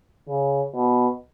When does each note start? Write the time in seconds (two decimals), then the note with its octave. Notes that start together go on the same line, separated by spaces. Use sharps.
0.29 C#3
0.75 B2